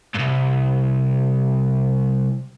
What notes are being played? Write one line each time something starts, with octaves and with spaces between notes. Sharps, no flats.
C2 G2